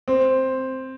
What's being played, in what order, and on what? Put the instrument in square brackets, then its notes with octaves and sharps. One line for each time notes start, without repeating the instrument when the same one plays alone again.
[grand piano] C4